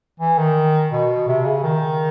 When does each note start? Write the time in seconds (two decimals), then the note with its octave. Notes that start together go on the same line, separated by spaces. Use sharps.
0.20 E3
0.38 D#3
0.92 B2
1.28 C3
1.45 C#3
1.64 D#3